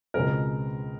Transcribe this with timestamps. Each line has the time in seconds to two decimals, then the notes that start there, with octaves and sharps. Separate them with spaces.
0.14 C#2 B2 G#3 C4 A#4